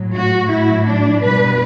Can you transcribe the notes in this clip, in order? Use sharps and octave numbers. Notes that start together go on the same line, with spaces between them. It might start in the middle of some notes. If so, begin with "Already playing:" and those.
Already playing: A2 F#3
F#4
A2 F#3 E4
D4
B2 G3 B4